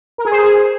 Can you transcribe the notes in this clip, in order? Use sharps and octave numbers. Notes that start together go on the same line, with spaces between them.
A#4
G#4
C5
G#4